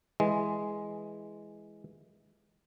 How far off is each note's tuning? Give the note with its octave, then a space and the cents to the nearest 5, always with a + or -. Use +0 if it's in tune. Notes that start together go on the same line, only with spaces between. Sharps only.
E3 +0 G#3 +0